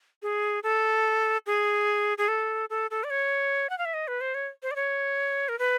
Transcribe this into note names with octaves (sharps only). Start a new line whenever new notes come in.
G#4
A4
G#4
G#4
A4
A4
A4
D5
C#5
F#5
F5
E5
D#5
B4
C5
C#5
C5
D5
C#5
A#4
B4